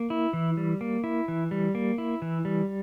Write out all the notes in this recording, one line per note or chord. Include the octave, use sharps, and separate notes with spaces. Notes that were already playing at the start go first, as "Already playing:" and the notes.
Already playing: A#3
E4
E3
G3
A#3
E4
E3
G3
A#3
E4
E3
G3